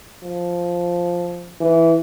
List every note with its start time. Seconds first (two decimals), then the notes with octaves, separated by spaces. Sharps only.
0.23 F3
1.60 E3